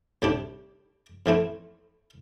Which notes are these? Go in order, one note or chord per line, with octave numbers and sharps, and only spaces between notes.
D2 C3 G3 D4 G4
F2 E3 A3 C4